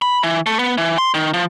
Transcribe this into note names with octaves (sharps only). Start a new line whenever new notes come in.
B5
E3
A3
B3
E3
C6
D#3
F3